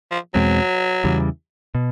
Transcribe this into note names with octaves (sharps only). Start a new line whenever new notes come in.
F3
E2 B2 F#3 G#3 C4
E2 C#3 E3 G3
B2